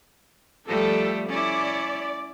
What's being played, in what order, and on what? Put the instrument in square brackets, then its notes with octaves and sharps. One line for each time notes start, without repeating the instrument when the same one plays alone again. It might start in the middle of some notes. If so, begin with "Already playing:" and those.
[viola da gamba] F3 G3 A3 [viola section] A4
[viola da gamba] C#4 E4 [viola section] D5